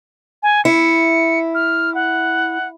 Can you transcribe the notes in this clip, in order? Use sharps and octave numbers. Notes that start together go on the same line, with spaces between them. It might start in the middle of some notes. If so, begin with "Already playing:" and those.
G#5
E4 C#7
F6
F#5